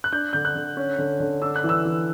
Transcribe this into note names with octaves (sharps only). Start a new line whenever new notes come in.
F#6
D4 G6
D3 G6
F#6
D3
C#4
D3
D3
D4 E6
F#6
E3
E6
E3